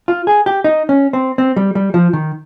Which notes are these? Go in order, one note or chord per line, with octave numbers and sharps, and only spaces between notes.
F4
G#4
G4
D#4
C#4
C4
C4
G3
G3
F3
D#3